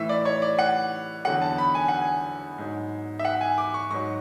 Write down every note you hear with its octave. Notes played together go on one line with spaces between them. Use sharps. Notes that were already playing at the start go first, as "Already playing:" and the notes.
Already playing: A2 E3 E5
D5
C#5
D5
F#5
E2 D3 F#3 F#5
A5
B5
G#5
F#5
G#5
G#2 F#3
E5
F#5
G#5
D6
C#6
G#2 F#3 C#6